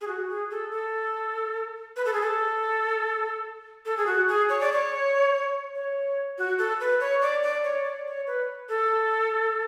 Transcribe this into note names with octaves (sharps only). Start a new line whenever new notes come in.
G#4
F#4
G#4
A4
A4
B4
A4
G#4
A4
A4
G#4
F#4
G#4
C#5
D5
C#5
C#5
F#4
A4
B4
C#5
D5
D5
C#5
D5
C#5
B4
A4